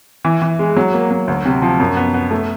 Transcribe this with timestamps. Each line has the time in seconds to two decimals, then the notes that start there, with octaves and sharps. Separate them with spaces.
0.25 E3
0.42 E3
0.59 G#3
0.77 F#3
0.93 A#3
1.11 F#3
1.28 D2
1.45 C3
1.62 F3
1.80 F#2
1.97 B3
2.14 B3
2.31 A3